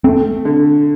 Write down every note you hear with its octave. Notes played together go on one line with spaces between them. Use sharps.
A3 C4
D3